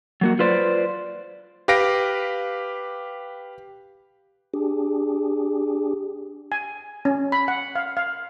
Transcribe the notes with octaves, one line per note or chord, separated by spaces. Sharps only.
F#3 A#3 F#4
F4 B4 C5 D5
G4 B4 F5 A#6 D7
D4 G4 G#4
G#5
C#4
B5
F#5
F5
F5